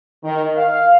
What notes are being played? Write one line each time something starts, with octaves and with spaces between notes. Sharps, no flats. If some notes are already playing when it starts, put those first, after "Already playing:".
D#3
F5